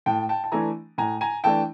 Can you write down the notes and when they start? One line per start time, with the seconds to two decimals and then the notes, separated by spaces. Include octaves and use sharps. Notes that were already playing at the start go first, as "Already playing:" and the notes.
0.06 A2 G5 A5
0.29 G5 A5
0.44 A5
0.52 E3 A3 D4 G#5 A#5
0.98 A2 G#5 A#5
1.21 G#5 A#5
1.44 E3 A3 D4 G5 A5